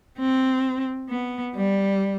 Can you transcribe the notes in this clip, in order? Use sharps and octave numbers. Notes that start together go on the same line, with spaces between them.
C4
B3
G3